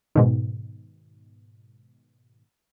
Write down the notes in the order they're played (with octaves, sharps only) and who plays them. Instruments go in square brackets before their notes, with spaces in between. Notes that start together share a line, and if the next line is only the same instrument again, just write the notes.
[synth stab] G#2 B2 D#3